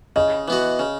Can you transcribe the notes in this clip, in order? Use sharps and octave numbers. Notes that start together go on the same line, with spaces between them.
C#3 D#5
E3 B3 F#4
C#3